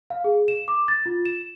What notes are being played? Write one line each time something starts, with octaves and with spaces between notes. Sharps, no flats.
F5
G#4
E7
D6
A6
F4
E7